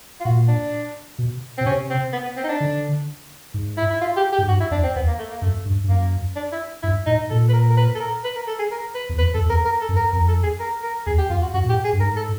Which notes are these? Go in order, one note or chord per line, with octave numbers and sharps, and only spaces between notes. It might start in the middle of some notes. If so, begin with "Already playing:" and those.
F4
A#2 F#4
D4
B2
B2 C4
C3 C#4
C4
B3
B3
C4
D#4
D4
D3
G#2
E4
E4
F4
G4
G4
G#2
G2 F#4
E4
F2 D4
C4
E2 B3
A#3
A3
A#3
F#2 A3
G2
G2
F#2 A#3
D4
E4
G2 E4
A2 D#4
A#2 A4
B4
A#4
A#4
B4
A4
A#4
B4
A#4
A4
G#4
A#4
B4
E2
F2 B4
F2 A4
E2
F2 A#4
A#4
A4
F#2
A#4
F2 A#4
A4
G#4
A#4
A#4
E2 G#4
G4
F2 F4
F#4
F#2 F#4
A#2
A2 G4
G#4
G2
G#2 A#4
A4